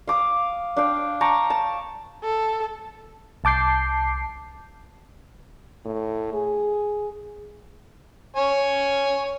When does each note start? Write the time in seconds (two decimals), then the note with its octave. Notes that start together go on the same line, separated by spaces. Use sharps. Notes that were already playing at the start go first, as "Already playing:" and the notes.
0.07 F5 D6 D#6
0.77 D4 F5 G5
1.21 G5 A5 A#5 C#6
1.50 A5
2.24 A4
3.44 C2 A5 D6 G6 C7
5.86 A2
6.33 G#4
8.36 C#5 G#5